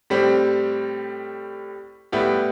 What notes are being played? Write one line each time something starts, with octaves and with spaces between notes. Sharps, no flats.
A2 G3 C4 G4
A2 G3 B3 E4 G4